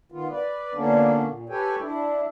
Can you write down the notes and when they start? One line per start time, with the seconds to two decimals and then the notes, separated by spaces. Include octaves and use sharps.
0.12 D#3 B3 F4
0.30 B4 D5
0.74 A#2 D3 A#3 B3 C#4 D4
1.25 A#2
1.49 G4 A4 B4 C#5 G5 G#5
1.80 D4 E4